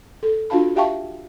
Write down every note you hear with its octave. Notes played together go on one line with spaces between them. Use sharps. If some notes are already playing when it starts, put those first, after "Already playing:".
A4
D4 F4 F#4 F5 A5 B5
G4 E5 F5 G5 A5 C#6